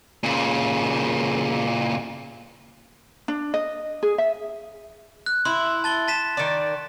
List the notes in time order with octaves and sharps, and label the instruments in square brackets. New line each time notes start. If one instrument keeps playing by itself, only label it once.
[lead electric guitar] A#2 C#3
[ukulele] D4
D#5
G#4
E5
[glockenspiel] F#6
[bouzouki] E4 [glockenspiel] C6
[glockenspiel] A5 A6 G7
A5 B6 E7
[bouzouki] D#3 D5